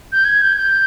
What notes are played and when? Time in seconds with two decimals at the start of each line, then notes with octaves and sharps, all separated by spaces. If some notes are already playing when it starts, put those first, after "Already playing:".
0.12 G6
0.25 G#6
0.41 G6
0.57 G6